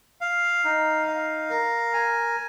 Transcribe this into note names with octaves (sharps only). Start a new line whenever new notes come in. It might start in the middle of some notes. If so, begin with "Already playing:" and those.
F5
D#4
F5
A#4
G#5